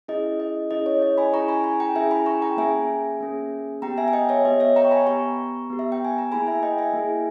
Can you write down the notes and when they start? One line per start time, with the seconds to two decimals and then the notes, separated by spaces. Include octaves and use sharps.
0.08 C#4 E4 G#4 D#5
0.40 D#5
0.71 C#4 E4 G#4 D#5
0.86 C#5
1.02 D#5
1.18 G#5 B5
1.33 C#4 E4 G#4 A#5 C#6
1.48 G#5 B5
1.64 G#5 B5
1.80 G5 A#5
1.95 C#4 E4 G#4 E5 G#5
2.11 G#5 B5
2.26 A#5 C#6
2.42 G5 A#5
2.57 A#3 C#4 G#4 E5 G#5
3.20 A#3 C#4 G#4
3.82 B3 G4 G5 A#5
3.98 E5 G#5
4.08 G#5
4.13 D#5 G5
4.29 C#5 E5
4.45 B3 G4 D#5
4.60 C#5 E5
4.76 G5 A#5
4.85 C#6
4.91 G#5 B5
5.07 B3 G4 A#5 C#6
5.70 B3 G4
5.79 E5
5.92 G5
6.05 G#5
6.18 A#5
6.31 A#3 E4 G#4 G#5 B5
6.47 E5 G#5
6.63 D#5 G5
6.78 E5 G#5
6.93 A#3 E4 G#4